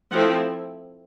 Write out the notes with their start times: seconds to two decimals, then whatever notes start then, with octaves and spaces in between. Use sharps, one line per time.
0.12 F3 A3 C4 E4 F#5